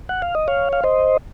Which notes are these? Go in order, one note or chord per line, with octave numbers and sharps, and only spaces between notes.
F#5
F5
D#5
C#5 F5
F5
C5 D#5